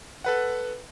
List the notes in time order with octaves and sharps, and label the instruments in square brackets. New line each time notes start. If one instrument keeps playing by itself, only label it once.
[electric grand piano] A4 B4 F#5